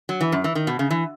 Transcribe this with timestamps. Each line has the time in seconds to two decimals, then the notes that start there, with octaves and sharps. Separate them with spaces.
0.09 F#3
0.21 E3
0.32 F#2
0.44 E3
0.55 D#3
0.67 B2
0.79 C#3
0.91 E3